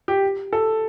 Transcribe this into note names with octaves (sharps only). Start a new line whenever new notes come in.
G4
A4